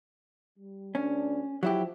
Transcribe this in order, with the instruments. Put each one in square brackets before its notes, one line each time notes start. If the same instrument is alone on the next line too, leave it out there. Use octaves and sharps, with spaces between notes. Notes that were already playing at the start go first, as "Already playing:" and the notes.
[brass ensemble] G3
[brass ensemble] D2 D4 [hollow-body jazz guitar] C#4
[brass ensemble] F3 [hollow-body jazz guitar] F#3 E4 G4